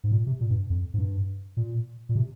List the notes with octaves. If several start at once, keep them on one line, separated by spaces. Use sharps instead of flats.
G#2
A#2
C3
A#2
G2
F2
G#2
G2
A#2
A#2
C3